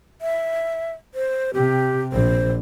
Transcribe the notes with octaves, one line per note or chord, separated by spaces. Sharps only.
E5
C5
C3 G4
A#1 C5